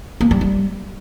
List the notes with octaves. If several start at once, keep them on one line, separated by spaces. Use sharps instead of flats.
A#3
G3
G3